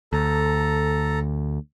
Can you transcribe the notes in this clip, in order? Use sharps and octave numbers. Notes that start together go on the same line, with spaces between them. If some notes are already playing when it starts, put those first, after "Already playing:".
D2 A4 A#5